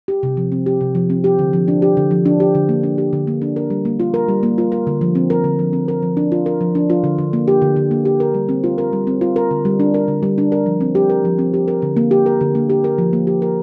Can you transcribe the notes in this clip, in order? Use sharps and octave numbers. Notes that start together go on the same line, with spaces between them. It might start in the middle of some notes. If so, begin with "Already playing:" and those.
G4
C3
F3
C4
G4
C3
F3
C4
G4
D3
F3
D4
G4
D3
F3
D4
G4
D3
A#3
D4
G4
D3
A#3
D4
A#4
G3
A#3
F4
A#4
G3
A#3
F4
A#4
D3
F3
C4
A#4
D3
F3
C4
A#4
F3
D4
F4
A#4
F3
D4
F4
D3
D3
A#3
G4
D3
D3
A#3
G4
A#4
G3
C4
F4
A#4
G3
C4
F4
A#4
D3
G3
D4
A#4
D3
G3
D4
A#4
F3
C4
G4
A#4
F3
C4
G4
A#4
D3
A#3
G4
A#4
D3
A#3
G4
A#4
F3
A#3
G4
A#4